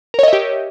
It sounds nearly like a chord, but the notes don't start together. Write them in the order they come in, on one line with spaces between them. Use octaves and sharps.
A#4 C#5 D#5 E5 G4